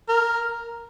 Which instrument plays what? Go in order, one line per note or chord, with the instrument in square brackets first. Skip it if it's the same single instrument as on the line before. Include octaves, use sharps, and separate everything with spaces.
[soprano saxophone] A#4